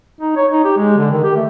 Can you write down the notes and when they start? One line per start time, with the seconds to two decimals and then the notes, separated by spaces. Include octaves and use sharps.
0.21 D#4
0.37 C#5
0.51 D#4
0.64 G4
0.77 G#3
0.98 D3
1.11 D#3
1.23 G4
1.36 A3